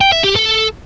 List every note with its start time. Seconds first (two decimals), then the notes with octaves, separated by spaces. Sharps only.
0.01 G5
0.12 E5
0.24 G4
0.35 A4